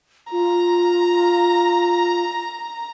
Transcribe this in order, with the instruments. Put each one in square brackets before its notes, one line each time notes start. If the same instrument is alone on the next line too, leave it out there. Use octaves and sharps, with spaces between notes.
[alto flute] F4 [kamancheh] A#5